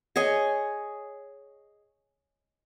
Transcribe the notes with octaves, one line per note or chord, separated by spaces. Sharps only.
G#4 C#5 D#5 G#5